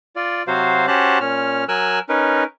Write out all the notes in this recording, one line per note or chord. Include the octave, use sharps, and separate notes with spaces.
F4 D5
C3 F#3 F#4 C5 F5
C#4 F#4 G4 C5 A5 F#6
A#2 C#4 F6
F#3 A#4 G#5 E6 F#6
C#4 D#4 A#4 B4